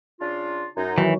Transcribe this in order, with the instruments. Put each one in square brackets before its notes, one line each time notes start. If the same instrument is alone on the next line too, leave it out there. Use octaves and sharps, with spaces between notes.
[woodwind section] C#3 D4 F4
F#2 D#4
[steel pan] D#3 F#3 [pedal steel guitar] E3